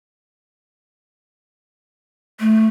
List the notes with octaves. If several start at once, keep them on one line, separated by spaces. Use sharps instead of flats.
A3